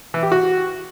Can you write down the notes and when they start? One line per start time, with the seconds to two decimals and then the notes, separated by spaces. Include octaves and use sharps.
0.14 E3
0.23 G4
0.32 F#4